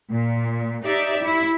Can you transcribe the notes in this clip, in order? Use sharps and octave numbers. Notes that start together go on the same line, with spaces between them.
A#2
D#4 G4 D5 E5
E4